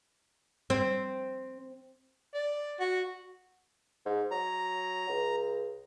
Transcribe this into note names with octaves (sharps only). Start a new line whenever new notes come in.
C4
D5
F#4
G#2
F#3 A#5
C#2